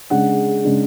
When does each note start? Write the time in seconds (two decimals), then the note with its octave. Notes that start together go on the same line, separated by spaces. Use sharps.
0.10 C#3 G#3 D4 F#5
0.65 C#3 G#3 D4